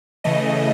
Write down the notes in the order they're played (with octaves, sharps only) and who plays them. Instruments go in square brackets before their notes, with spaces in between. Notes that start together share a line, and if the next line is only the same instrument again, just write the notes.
[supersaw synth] C#3 E3 A3 D#5